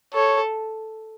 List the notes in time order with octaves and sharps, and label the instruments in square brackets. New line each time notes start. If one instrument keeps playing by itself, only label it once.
[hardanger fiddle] A4 [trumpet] C#5